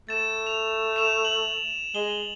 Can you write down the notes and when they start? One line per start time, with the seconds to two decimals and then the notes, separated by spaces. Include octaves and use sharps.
0.09 A3 A6 E7
0.47 F7
0.96 E7 F7
1.25 F#7
1.95 G#3 G7